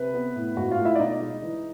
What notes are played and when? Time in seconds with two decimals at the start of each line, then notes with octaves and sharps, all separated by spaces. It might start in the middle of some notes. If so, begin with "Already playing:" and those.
Already playing: C3 B4
0.14 B3
0.36 A2
0.57 G#2 F#4 F#5
0.71 F4 F5
0.79 A3
0.85 E4 E5
0.95 D5
0.99 B2 D#4 D#5
1.21 G#3
1.43 E3